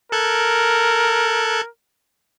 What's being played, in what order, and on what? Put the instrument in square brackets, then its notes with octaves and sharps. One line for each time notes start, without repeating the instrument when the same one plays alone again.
[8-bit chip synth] A4 F#6 G#6 [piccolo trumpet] A#4